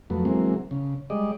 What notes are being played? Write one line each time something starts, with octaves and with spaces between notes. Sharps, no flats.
F2 F#3 A3 B3
E3 F#3 G#3 A#3 C4
C#3
G3 G#3 D5 D#5